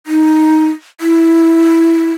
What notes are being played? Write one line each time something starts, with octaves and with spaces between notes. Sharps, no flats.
D#4
E4